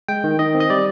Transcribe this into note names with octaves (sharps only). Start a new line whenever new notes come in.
G#3 G5
D#3
D#3 D#5
C4
D#5
G3 D5